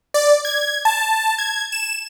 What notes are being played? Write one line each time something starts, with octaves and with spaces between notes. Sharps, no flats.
D5
G#6
A5
G#6
E7